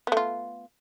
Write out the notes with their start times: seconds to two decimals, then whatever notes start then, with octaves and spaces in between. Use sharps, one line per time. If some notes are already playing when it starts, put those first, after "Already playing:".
0.07 B3
0.12 A3
0.17 F4